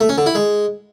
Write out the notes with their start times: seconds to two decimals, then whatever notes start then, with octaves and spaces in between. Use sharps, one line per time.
0.01 A3
0.09 C#4
0.18 D3
0.26 E4
0.35 G#3